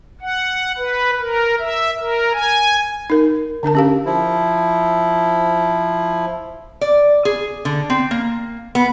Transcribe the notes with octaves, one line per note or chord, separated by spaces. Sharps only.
F#5
B4
A#4
E5
A#4
G#5
D#4 A#4
D3 D4 A#4 A5
C#4 G4 F5
F3 E4
D5
G#4
D3
C4
A#3
B3